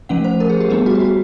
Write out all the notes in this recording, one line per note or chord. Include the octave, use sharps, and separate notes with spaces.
F3 A3 C#4 F#5
C5
A#4
G#4
G4
G3 B3 D4 G#4
F#4
G4
F#4